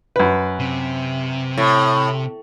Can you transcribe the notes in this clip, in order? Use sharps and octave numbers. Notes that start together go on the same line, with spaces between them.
F#2 B4
C3
A2